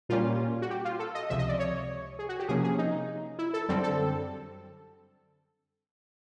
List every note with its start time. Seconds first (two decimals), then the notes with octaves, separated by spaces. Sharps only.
0.09 A#2 G3 A#3 C#4 F4
0.62 F#4
0.70 G4
0.85 F4
0.99 A4
1.15 D#5
1.30 C#2 C3 F3 E5
1.39 D#5
1.49 D5
1.59 C#5
2.19 G#4
2.29 F#4
2.39 G4
2.48 C3 F3 A#3 C#4 G#4
2.64 G#4
2.79 D#4
3.39 E4
3.54 A4
3.69 F#2 D3 G3 C4 A4
3.83 A4